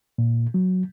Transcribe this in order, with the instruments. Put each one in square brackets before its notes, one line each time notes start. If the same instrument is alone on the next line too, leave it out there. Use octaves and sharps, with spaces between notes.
[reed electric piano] A#2
F#3